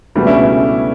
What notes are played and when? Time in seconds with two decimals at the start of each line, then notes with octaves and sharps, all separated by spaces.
0.15 C#2 B2 E3 G3 A3 D4 A4
0.27 C#4 E4